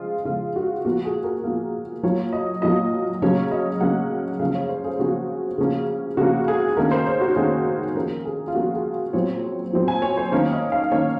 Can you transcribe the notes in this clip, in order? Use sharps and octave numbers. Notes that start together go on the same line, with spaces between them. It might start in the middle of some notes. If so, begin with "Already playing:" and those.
Already playing: C#3 F3 G#3 F4
C#3 F3 G#3 F4
F#4
A#2 F3 A#3 F#4
G#4
A#4
A#2 F3 A#3
A#2 F#3 A#3 C#5
D#5
A#2 F#3 A#3 D#5
C#3 F#3 A#3 C#4 C#5
D#5
C#3 F#3 A#3 C#4 F#5
C#3 F3 A#3 C#4 F5
C#5
C5
G#4
C#3 F3 A#3 C#4 F#4
C#3 F3 A#3 C#4
C#3 F3 A#3 C#4 F#4
G#4
D#3 A#3 C#4 A#4
C5
C#5
F#4
D#3 A#3 C#4 G#4
F3 A#3 C#4 A#4
G#4
F4
F3 A#3 C#4 F#4
G#4
A#2 F#3 C4 C#5
A#2 F#3 C4
G#5
C#5
C5
D#3 A#3 C#4 C#5
D#5
F5
D#3 A#3 C#4 C#5